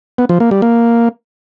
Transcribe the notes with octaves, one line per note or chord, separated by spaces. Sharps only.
B3
F3
A#3
G3
A#3